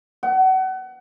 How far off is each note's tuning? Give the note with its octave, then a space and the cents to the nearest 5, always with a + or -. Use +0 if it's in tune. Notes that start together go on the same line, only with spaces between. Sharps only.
F#5 +30